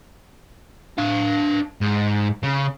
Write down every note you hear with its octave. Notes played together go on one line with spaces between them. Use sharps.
D4 F5
G#2
C#3